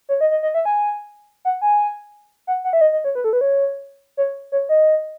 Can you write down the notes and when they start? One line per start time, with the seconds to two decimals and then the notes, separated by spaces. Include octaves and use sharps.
0.09 C#5
0.21 D#5
0.31 D#5
0.43 D#5
0.54 E5
0.65 G#5
1.45 F#5
1.62 G#5
2.47 F#5
2.64 F#5
2.73 E5
2.81 D#5
2.92 D#5
3.04 C#5
3.15 B4
3.24 A4
3.33 B4
3.41 C#5
4.17 C#5
4.52 C#5
4.69 D#5